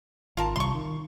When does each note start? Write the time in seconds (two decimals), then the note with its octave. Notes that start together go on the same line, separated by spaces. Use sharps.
0.37 G#1 F4 A#4 A5
0.56 C2 C6 C#6
0.75 D#3